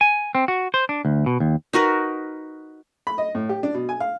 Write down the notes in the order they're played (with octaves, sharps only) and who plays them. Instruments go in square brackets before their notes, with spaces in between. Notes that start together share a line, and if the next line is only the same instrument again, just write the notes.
[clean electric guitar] G#5
C4
F#4
C5
D4
D2
B2
D#2
[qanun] D#4 F#4 A#4 B4
[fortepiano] B5
D#5
A2
G4
D4
B2
G#5
F5